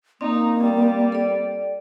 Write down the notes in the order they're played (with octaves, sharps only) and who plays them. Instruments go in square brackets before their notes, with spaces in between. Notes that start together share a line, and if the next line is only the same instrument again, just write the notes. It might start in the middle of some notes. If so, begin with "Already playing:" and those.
[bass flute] A#3 [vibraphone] C4 [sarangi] D#4
[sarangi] G3
[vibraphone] A4 D5